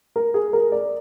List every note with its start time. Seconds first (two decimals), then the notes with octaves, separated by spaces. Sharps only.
0.16 A#4
0.34 G#4
0.53 A#4
0.72 D5